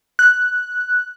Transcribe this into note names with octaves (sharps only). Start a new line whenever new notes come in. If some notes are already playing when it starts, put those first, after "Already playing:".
F#6